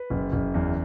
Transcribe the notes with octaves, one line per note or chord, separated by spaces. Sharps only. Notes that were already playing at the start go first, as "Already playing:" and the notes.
Already playing: B4
F#1
F#1
E2